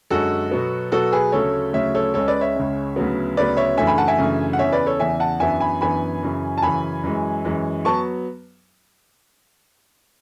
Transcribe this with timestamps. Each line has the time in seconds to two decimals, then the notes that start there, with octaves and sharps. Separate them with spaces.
0.10 F#2 D3 G#3 C#4 F#4 A4
0.51 B2 F#3 B3
0.92 B2 F#3 B3 F#4 A4
1.12 G#4 B4
1.32 D2 C#3 F#3 A3 A4 C#5
1.73 D2 C#3 F#3 A3 C#5 E5
1.95 A4 C#5
2.14 C#2 C#3 G#3 C#4 A4 C#5
2.28 B4 D5
2.41 C#5 E5
2.56 C#2 C#3 G#3 C#4
2.96 D2 C#3 F#3 B3
3.37 D2 C#3 F#3 B3 B4 D5
3.57 C#5 E5
3.77 F#2 C#3 E3 A3 D4 E5 G#5
3.87 G#5 B5
3.98 F#5 A5
4.08 E5 G#5
4.18 F#2 C#3 E3 A3 D4
4.53 F#5
4.59 E2 C#3 E3 C#5 E5
4.72 B4 D5
4.86 A4 C#5
4.99 E2 C#3 E3 E5 G#5
5.20 F#5 A5
5.40 F#2 E3 B3 D4 E5 G#5
5.60 G#5 B5
5.81 F#2 E3 B3 D4 G#5 B5
6.23 F#2 C#3 E3
6.58 A5
6.62 F#2 C#3 E3 G#5 B5
7.04 F#2 E3 G#3
7.45 F#2 E3 G#3
7.85 F#3 B3 A5 C#6